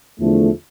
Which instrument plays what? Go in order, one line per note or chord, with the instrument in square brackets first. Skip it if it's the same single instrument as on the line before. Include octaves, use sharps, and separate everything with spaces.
[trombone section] E2 D3 F3 A3